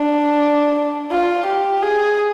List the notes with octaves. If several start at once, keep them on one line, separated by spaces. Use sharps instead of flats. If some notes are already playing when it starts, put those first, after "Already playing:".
Already playing: D4
F4
G4
G#4